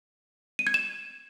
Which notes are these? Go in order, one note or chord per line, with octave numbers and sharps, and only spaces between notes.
D#7
G#6
E7